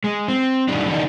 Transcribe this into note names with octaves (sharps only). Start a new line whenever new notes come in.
G#3
C4
D#3 E3 G3 D4
D3 E3 D4 D#4